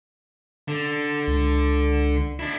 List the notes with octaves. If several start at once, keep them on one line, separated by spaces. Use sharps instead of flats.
D3
C#2
D4 E4